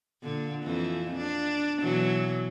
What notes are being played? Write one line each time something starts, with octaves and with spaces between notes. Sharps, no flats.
A#2 D3
F2 E3
D4
B2 E3 F#3